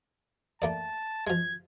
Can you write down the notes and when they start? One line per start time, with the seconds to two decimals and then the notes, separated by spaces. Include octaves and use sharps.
0.62 A3 A#3 D5 A5
1.27 F3 G#3 G#6